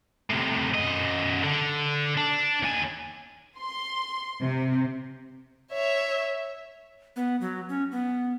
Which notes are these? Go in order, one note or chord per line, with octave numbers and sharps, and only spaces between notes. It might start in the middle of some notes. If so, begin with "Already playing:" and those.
A2 C3
F#2 D#5
D3
D4
D#2 G#5
C6
C3
C#5 E5
B3
F#3
C#4
B3